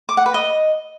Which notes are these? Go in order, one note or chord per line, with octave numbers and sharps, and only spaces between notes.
D6
F#5
B4
D#5